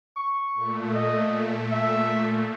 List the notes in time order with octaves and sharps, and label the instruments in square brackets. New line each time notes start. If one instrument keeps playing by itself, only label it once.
[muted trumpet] C#6
[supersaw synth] A#2 A3
[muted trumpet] D#5
E5